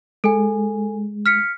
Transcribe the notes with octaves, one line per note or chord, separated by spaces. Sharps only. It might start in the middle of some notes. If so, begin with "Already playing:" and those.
G#3 A4 G#5
F6 B6 C#7